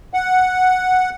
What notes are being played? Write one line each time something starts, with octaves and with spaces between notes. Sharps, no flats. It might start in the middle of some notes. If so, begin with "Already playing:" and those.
F#5